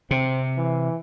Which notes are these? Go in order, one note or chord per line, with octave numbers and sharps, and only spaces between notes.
C3 C4
E3